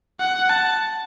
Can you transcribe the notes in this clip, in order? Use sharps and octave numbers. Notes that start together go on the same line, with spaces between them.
F#5
A5